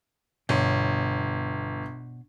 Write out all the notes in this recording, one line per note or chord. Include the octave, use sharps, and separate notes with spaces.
G1 B2 C#5 C6